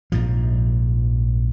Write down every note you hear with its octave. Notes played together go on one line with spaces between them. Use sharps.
A#1 G#2 F3